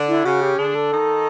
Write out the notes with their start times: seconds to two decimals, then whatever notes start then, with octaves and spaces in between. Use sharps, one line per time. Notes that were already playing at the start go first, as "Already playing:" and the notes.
Already playing: D3 D4
0.08 E4
0.25 C#3 C#4 F#4
0.42 G4
0.58 D3 D4 G#4
0.75 A4
0.91 D#3 D#4